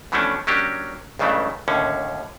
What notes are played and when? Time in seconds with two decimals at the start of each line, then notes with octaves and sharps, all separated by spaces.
0.12 B2 E3 F3 A3 C#4 D4
0.47 F#3 A#3 C#4 D4 G4
1.19 C#2 G2 C#3 E3 F#3 A3
1.68 D#2 A2 D3 C#4